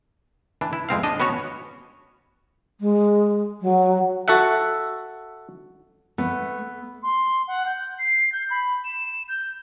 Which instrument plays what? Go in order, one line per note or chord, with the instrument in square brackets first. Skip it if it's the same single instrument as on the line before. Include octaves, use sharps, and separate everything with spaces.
[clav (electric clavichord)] E3 D4
E4
F2 G#3 C4 F5
D4 D#5
B3 C#4 F#4 C#5
[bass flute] G#3
F#3
[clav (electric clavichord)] F#4 A4 E5 F#5
[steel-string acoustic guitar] A3 [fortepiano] B3
[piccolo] C6
F#5
G6
C7
G6
B5
E7
G6